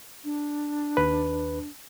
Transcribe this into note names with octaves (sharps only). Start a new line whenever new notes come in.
D4
D#2 B4